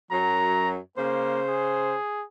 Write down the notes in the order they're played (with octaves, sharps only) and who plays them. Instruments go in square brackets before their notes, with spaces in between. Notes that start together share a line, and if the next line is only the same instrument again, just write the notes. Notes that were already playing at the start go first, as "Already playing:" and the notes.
[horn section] F#2 F#3 [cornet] A#5
[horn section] C#3 C5 [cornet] A#3
[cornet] G#4